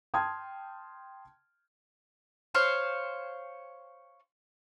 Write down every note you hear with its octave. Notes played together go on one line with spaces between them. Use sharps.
G5 A5 C6 D#6 F6 G#6
C5 C#5 F5